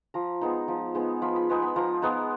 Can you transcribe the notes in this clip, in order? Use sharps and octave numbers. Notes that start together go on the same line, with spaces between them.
F3 A#5
G#3 B3 D#4
F3
G#3 B3 D#4
F3 B5
B5
G#3 B3 D#4
B5
F3 A#5
G#3 B3 D#4